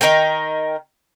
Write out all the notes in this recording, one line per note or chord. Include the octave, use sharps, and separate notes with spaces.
D#3 D#4 A#4 G5